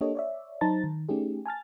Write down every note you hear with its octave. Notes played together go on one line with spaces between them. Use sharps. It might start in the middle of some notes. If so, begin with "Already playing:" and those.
A#3 D4 G4 A4 C#5 D#5
C#5 D5 E5
F#3 D#4 C5 A5 A#5 A6
D#3
A3 C#4 D#4 G4 G#4
G#5 A5 F6 A6